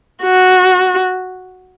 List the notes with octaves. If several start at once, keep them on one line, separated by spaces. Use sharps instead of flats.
F#4